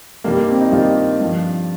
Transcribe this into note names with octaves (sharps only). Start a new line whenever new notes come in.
G2 D#3 G3 A#3
A#3
C4
D#4
G2 D#3 G3 F4
G2 F3